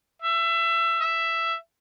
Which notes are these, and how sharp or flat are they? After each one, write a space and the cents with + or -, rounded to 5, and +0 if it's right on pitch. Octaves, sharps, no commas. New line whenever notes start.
E5 +25
E5 +10